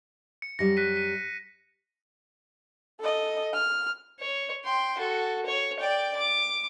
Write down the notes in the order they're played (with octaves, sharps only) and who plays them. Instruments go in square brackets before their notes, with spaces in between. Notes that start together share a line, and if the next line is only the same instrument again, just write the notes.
[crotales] C#7
[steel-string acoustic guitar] F#2 G3 [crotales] A#6 C#7
[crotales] F#6 B6 D#7
B6 D#7
[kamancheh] A4 D#5
F6
[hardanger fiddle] C#5
G5 C6
F#4 A4
C#5
D5 G5
D6